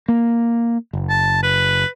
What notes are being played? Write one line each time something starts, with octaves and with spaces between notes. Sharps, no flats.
A#3
F#1
A5
B4